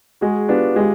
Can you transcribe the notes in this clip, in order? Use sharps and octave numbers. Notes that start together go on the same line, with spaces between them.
G#3 F#4 G#4
B3 D4 F4 G4
G#3 F4 G4